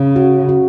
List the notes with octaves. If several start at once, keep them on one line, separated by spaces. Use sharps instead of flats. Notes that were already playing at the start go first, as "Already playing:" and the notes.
Already playing: C#3
F#4
F#4